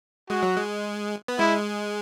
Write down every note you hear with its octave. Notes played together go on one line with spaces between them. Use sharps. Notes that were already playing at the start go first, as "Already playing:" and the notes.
G#3 F#4
F#3
G#3
B3
G#3 E4